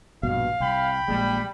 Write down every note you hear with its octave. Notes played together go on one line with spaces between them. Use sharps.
A#1 G2 B2 F5
C2 G5 B5
A#1 G3 G#3